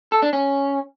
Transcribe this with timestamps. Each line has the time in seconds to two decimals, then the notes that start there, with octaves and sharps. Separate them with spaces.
0.12 A4
0.22 D4
0.33 C#4